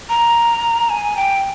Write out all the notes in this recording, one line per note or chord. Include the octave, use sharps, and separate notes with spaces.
A#5
G#5
G5